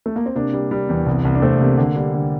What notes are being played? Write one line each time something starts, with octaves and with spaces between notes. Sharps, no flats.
A3
A#3
C4
C3 A#3 D4
G3
G3
E2
C2
C2
D4
C2 A3 C4
C3 A#3
D3
G3
D3